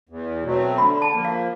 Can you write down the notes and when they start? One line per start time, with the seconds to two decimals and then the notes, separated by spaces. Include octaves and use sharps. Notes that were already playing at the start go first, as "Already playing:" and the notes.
0.09 E2
0.43 B2 F#3 A3 C4
0.78 D3 B5
1.02 A5
1.14 F3 A#3
1.25 F5